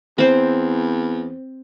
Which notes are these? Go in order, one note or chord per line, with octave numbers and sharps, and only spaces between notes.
E2 C4 C5